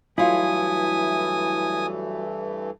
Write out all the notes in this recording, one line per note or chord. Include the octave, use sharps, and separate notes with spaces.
G2 E3 F#3 A3 E4 F4 G#5 D#6